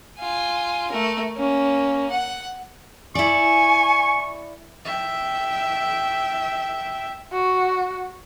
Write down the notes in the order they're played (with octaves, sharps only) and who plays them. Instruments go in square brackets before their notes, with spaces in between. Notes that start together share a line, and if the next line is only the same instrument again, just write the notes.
[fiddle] F4 G#5
A3 A#4
A#3 C#4
F#5
[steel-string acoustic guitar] E4 D5 [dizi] G#5 [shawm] C#6
[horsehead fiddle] E5 G5
[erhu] F#4